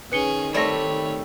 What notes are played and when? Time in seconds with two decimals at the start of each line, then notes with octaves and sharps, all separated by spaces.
0.12 D#3 C#4 G#4 B4 C#7 G7
0.54 G3 A3 C4 C#5 D5 B5 A#6